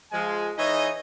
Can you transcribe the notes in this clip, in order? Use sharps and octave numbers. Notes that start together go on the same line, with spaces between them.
F3 G#3 G#5
E3 D#4 G#4 C#5 D#5